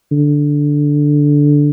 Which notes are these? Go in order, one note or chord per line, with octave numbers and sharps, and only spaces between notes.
D3